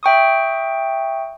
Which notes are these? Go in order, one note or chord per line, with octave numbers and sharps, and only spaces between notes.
E5 G5 C#6 D#6